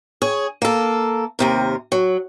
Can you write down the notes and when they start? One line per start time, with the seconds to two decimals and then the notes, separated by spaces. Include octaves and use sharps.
0.22 G#4 C#5
0.62 A#3 A4
1.39 D#2 C3 A#4
1.92 F#3